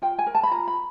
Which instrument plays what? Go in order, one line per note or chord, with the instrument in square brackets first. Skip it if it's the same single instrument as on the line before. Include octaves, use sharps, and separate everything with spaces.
[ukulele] F4 G5
G#5
A#4
A5
B5
F4 A#5
B5